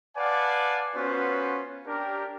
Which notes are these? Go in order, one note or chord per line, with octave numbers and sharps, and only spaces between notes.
B4 D5 F5 F#5 G#5 A5
B3 C#4 F4 F#4 B4 C5
D4 G4 A#4